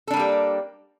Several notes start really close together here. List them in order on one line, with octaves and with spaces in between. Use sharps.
A4 D4 G3 A#3 G4